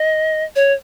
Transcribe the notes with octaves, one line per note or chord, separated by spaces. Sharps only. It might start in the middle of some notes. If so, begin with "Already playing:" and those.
Already playing: D#5
C#5